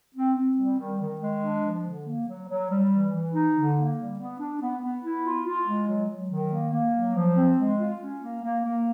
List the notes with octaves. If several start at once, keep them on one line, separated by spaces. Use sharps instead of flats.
C4
C4
G3
D#3
D#3
G#3
D4
F3
D3
A#3
F#3
F#3
G3
E3
E3
D#4
D3
A#3
G3
B3
D4
B3
B3
E4
F4
F4
G#3
F#3
F#3
D#3
A#3
A#3
F#3
F3
C4
G#3
F4
C#4
A#3
A#3
A#3